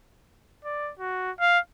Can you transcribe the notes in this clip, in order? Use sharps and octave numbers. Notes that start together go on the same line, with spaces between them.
D5
F#4
F5